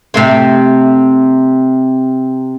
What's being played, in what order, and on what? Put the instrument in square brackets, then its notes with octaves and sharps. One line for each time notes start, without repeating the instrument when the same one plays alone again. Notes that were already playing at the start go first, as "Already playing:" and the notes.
[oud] C3 A3 C4